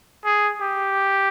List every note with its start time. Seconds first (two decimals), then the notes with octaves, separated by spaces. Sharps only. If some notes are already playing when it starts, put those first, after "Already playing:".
0.25 G#4
0.61 G4